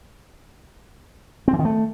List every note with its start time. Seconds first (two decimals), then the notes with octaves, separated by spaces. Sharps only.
1.48 C4
1.53 E3
1.59 D#3
1.65 A3